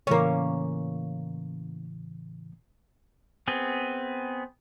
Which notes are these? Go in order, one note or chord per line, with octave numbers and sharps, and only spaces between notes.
A2 C#3 E3 A#3 C#4
B3 C4 G#4